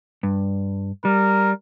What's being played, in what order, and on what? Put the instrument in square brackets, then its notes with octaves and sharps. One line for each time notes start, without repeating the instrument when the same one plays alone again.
[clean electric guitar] G2
[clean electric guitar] G3 [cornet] A#4